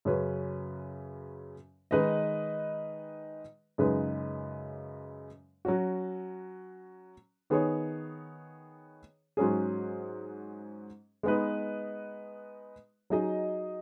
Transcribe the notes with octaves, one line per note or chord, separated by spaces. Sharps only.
F#2 C#3 F#3 C#4 B4
D#3 G#3 D#4 B4 D#5
F#2 C#3 G#3 D#4 B4
F#3 C#4 F#4
D#3 B3 G#4 C#5
G#2 F#3 C#4 G#4
G#3 B3 D#4 B4
F#3 D#4 G#4 D#5